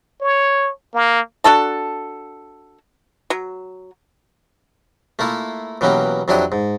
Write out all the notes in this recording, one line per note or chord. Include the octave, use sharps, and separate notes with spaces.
C#5
A#3
D4 F#4 A4 A5
F#3
A3 A#3 E4 F4
B2 E3 F#3 A#3 C#4 G4
F2 F#3 D4 E4 G4 D#6
G#2